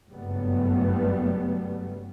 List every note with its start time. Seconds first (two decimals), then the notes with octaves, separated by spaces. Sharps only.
0.10 F#1 G2 F#3 G3 A3 B3